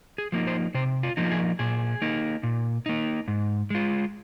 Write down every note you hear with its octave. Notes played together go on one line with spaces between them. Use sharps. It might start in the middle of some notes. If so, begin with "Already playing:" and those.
G#4
F3 A#3 D#4
C5
C3 C5
F4
F3 A#3 D#4
F4
G#4
A#2 G#4
A#3 D#4
A#2
A#3 D#4
G#2
G#3 F4